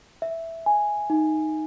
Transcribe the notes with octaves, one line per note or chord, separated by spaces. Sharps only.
E5
G#5
D#4